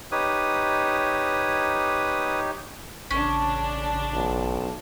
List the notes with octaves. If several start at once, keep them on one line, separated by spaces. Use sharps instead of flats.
D#4 G4 B4 C#5 D#6
A1 C#3 C#4 D4
B1